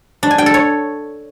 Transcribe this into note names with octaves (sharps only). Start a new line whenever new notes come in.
D4
G#5
G5
A4
C#5